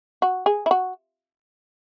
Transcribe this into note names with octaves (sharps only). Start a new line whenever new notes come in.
F#4
G#4
E4
F#4